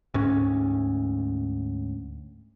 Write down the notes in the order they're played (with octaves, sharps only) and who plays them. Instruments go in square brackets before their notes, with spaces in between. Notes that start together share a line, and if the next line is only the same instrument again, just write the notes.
[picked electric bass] D2 G#2 C#4